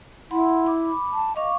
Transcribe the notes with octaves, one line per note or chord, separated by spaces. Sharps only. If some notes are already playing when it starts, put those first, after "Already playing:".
E4 F#5 B5 C6
B5 D6
A5
D#5 F5 C#6 D6